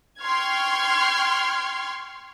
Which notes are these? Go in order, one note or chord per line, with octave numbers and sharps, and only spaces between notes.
G5 C6 C#6 F6 G#6